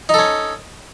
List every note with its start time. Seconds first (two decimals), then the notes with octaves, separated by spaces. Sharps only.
0.09 D#4
0.14 A4
0.19 C#4